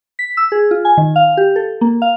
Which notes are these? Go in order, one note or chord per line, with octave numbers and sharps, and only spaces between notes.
B6
E6
G#4
F4
G#5
D#3
F5
G4
A4
A#3
F5